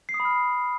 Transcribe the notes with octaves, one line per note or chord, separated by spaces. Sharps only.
C7
D#6
B5
F6